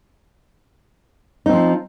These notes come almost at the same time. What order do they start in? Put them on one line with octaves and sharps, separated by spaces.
D#4 C4 F3